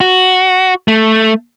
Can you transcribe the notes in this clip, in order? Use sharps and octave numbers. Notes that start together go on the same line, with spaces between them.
F#4
A3